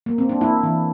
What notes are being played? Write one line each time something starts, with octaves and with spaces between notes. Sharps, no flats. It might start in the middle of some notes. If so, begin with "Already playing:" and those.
A#3
C4
D4
A#3 E4
E3